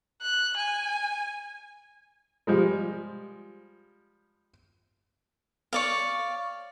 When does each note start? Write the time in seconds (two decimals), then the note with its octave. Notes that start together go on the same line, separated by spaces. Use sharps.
0.22 F#6
0.57 G#5
2.47 F3 G3 G#3
5.73 C#5 D5 F5